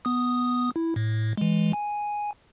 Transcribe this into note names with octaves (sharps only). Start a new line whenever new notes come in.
B3 D#6
E4
A2
E3 G#3
G#5